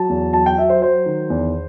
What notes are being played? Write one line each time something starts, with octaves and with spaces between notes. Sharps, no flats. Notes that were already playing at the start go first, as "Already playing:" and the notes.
Already playing: F#3 A5
E2
F#3 A5
G5
F#3 E5
C5
F#3 C5
D#3
E2